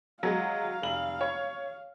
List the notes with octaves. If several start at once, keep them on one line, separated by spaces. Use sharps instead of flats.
F#3 G#3 F5
F1 F#7
C#5